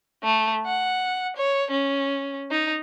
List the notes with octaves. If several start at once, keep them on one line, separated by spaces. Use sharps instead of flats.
A3
F#5
C#5
C#4
D#4